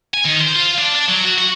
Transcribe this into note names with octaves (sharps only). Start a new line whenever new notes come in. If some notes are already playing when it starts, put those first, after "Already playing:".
G#5
D#3
C5
F4
D4
D4
F#3
F#4
F#4